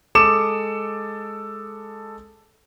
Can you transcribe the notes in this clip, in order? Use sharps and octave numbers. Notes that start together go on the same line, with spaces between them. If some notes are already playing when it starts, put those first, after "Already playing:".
G#3 A4 D6 D#6 C#7 E7